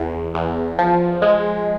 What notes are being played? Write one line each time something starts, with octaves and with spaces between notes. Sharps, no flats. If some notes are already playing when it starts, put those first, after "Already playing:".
Already playing: E2
E2
F3
G#3